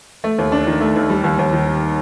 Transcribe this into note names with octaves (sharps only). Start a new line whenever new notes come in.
A3
D#2
D4
D#3
A3
D#2
G3
D#2
D#2
D#3